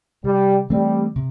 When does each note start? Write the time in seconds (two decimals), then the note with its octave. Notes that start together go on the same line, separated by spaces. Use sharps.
0.24 C3 G3
0.70 E3 G3 A3 C4
1.16 C3